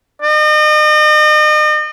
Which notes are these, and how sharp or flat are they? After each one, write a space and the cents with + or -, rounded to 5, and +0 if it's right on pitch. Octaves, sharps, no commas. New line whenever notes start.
D#5 -40